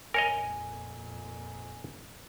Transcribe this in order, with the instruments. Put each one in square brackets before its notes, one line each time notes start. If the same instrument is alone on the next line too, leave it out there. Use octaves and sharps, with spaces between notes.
[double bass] F2 A#2 [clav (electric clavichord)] A#4 C#5 D#5 [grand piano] G#5